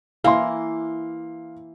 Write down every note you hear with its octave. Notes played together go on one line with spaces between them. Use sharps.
E3 A#3 F5 C6